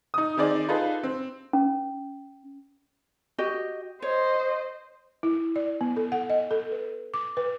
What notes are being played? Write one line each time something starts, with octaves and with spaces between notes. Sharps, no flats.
D#4 D#6
D#3 C4 D#4 G#4 D5
D#4 F4 G#4 A4 B4
C4
C#4
F#4 G4 D#5
C5 C#5 D#5
E4
D5
B3
A4
F#5
D#5
A4
B4
D6
B4